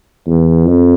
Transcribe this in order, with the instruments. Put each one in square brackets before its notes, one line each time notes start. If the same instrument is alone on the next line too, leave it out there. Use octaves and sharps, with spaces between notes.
[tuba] E2
F2